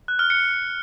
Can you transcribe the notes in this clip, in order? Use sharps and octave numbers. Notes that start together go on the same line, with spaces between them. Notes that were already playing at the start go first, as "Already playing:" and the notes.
F#6
F6
C#7